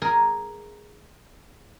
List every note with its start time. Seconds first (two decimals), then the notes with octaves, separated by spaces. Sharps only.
0.02 G#4 A#4 G#5